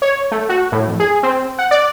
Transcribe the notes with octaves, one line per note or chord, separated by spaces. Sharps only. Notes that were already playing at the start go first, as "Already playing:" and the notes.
C#5
A3
F#4
A2
F2
G#4
C4
F#5
D5